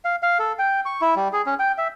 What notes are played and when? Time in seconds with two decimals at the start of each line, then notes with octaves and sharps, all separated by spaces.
0.05 F5
0.22 F5
0.39 A4
0.59 G5
0.85 C#6
1.01 E4
1.16 G3
1.33 G#4
1.46 C#4
1.59 G5
1.78 E5